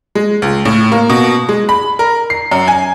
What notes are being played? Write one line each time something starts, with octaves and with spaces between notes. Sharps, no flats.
G#3
C#2
A2
A#3
B2
G#3
B5
A#4
C7
F#2
G#5